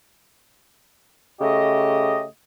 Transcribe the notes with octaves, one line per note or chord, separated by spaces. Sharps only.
C#3 A3 G4 D#5